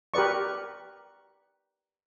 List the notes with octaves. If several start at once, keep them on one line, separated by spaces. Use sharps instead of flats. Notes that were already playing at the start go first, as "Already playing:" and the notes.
G4 A#4 B4 D5 C#6